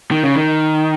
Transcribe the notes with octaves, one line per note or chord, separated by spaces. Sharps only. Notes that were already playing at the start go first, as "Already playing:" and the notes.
D#3
C#3
D#3